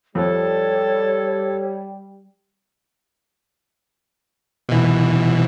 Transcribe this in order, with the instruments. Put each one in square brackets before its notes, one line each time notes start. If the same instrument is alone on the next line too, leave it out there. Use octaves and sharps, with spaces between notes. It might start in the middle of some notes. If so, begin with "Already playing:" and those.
[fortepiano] F2 [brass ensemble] G3 [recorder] A4 [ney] C#5
[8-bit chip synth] B2 E3